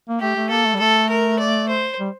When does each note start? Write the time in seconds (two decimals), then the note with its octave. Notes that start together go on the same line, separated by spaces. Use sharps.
0.09 A#3
0.20 A3 G4
0.36 A3
0.50 A#3 A4
0.66 A3
0.74 G3
0.80 A3 A4
1.10 A#4
1.40 D5
1.69 C5
1.99 G3